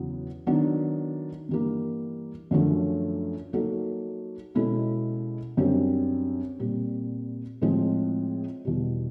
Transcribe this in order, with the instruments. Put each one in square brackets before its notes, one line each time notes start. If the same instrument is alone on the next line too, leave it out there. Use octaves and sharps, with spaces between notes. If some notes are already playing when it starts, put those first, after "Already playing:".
Already playing: [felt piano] E2 C#3 F#3 B3 E4
D#3 F#3 B3 D4
G2 E3 G3 A#3
F#2 D3 F3 A3 C#4
F#3 A#3 D#4 F#4 A4
B2 G#3 C#4 E4 A4
F#2 D3 G3 C4
A#2 G3 C4
A2 F3 G#3 C4
E2 B2 G3